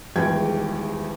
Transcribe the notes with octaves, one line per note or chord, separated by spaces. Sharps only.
D#1 E2 G#3 G5 G#6